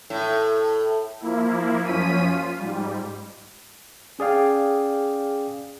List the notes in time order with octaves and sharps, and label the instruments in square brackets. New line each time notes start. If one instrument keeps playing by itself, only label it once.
[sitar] A2
[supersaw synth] F3 A#3 E4
F#2 F3 C#4 B6 D#7
F4
G#2 G3
[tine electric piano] C#4 G#4 D5 F5 G5